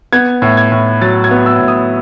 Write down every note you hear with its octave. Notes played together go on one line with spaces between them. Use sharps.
B3 G#6
A2
G#6
A2
F#3 A6
G#6
B3
E6
A2
D#6